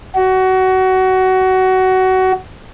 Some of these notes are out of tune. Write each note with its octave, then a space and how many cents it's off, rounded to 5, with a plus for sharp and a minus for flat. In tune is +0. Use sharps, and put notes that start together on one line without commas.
F#4 +20